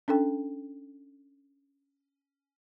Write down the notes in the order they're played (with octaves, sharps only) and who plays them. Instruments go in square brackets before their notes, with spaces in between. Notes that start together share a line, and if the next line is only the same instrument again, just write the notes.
[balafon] C#4 D4 A4 G5